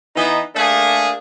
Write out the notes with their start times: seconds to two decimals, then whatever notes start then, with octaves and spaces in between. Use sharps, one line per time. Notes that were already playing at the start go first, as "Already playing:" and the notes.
0.16 E3 B3 D#4
0.56 A3 A#3 D4 G#4